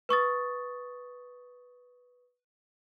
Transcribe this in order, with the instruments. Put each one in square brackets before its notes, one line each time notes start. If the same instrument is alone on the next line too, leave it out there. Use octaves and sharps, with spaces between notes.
[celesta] B4 C#6 D#6 A6